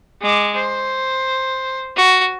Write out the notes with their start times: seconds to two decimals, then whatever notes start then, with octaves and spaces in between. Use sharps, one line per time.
0.22 G#3 D6
0.55 C5
1.96 F#4